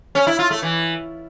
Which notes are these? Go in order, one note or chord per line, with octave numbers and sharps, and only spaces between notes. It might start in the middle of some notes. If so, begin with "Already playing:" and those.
C#4
E4
F4
A3
E3